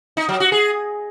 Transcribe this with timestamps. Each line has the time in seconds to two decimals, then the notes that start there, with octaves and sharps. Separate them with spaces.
0.17 D#4
0.29 F#3
0.40 F#4
0.52 G#4